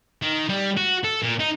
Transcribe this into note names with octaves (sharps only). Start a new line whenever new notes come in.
D#3
G3
F#4
A4
A#2
D#4